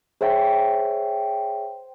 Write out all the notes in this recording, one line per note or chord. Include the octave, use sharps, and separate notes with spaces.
G#4 C5 C#5 E5 G5